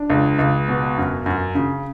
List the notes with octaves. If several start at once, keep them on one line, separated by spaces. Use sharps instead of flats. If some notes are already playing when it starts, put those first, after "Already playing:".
Already playing: D4
C#2
C#2
B2
F#2
F#2
C#3